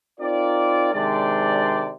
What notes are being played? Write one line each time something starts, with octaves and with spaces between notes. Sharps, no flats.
C4 D#4 F4 A#4 D5
C3 D#3 G#3 D4 C5 D5